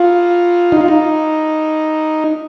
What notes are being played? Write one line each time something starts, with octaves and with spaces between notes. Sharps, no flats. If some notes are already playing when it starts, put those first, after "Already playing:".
Already playing: F4
D#4
F4
D#4